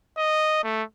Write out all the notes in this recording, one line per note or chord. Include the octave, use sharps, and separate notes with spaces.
D#5
A3